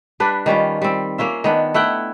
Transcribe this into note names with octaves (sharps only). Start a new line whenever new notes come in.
G3 D4 B4
D#3 G3 C#4 F4
G3 C4
A#3 C#4 F4 E5
D#3 B3 D4
A3 E4 F#5 G5